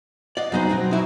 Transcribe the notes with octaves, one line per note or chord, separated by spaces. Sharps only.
D5 D#5 F5 F#5
E2 F#3 B3 D#4 C5
B2 F#3 C4
D#4 E4 F#4